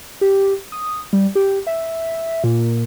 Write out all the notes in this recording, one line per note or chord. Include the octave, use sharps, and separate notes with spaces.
G4
D#6
G3
G4
E5
A#2